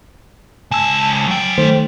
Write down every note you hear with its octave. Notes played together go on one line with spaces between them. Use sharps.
C#2 G#5 A5 E6
F#3 G5
D#3 A3 C5